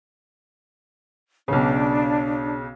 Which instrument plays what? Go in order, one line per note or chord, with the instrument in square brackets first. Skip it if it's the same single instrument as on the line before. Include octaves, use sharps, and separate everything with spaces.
[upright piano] B1 C#3 [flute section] D4